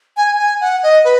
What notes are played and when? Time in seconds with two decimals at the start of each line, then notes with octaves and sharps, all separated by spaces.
0.17 G#5
0.39 G#5
0.61 F#5
0.83 D#5
1.05 B4